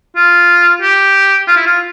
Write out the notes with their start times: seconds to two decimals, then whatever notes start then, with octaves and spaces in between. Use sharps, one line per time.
0.16 F4
0.82 G4
1.48 F4
1.57 E4
1.66 F4